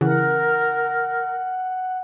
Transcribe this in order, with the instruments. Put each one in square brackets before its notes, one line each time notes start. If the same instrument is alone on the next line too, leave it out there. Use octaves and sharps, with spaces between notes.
[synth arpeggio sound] C#3 E3 [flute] A#4 [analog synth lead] F#5